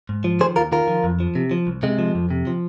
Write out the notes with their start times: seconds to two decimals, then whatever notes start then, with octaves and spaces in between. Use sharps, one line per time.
0.09 G#2
0.24 F3
0.40 D#3 G#4 C5
0.56 D#2 F4 A#4
0.72 D#3 F4 A#4
0.88 F3
1.04 F2
1.20 F3
1.35 C3
1.51 F3
1.67 C2
1.83 C3 G#3
1.99 F3
2.15 F2
2.31 C3
2.47 F3